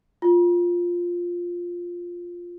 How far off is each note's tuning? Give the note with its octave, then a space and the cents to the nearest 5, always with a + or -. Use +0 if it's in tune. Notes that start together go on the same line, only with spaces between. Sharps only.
F4 +5